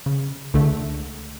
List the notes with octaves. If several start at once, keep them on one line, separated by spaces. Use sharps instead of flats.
C#3
C#2 D3 A3